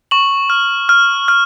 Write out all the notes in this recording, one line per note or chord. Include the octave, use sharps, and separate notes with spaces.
C#6 F#7
F6
F6
F6